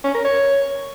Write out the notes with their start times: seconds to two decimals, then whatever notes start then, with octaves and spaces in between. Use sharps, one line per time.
0.04 C#4
0.14 A#4
0.24 C#5